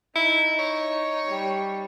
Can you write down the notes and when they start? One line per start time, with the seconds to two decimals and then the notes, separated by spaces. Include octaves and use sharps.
0.16 D#4 E4
0.59 C#5
1.27 G3